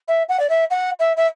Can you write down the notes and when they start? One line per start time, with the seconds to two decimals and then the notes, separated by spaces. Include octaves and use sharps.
0.08 E5
0.29 F#5
0.40 D5
0.50 E5
0.71 F#5
1.00 E5
1.17 E5